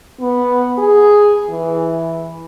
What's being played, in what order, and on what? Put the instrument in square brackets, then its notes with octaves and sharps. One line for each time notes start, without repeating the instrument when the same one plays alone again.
[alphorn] B3
G#4
E3